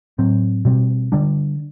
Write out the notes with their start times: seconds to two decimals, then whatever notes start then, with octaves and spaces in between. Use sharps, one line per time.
0.18 A2 F#3 C4
0.65 B2 G3 C4
1.12 D3 G3 D4